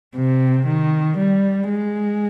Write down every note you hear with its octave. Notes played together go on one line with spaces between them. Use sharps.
C3
D#3
G3
G#3